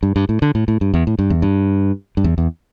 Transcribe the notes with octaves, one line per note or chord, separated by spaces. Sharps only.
G2
G2
A2
D3
A2
A2
G2
E2
A2
G2
E2
G2
G2
E2
E2